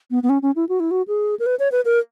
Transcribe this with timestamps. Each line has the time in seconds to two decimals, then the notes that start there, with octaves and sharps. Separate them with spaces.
0.11 B3
0.23 B3
0.29 C#4
0.42 C#4
0.56 E4
0.69 F#4
0.80 E4
0.91 F#4
1.08 G#4
1.40 A#4
1.46 B4
1.59 C#5
1.72 B4
1.85 A#4